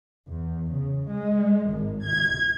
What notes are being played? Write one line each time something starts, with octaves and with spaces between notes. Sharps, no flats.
E2
C#3
G#3
G#1
G#6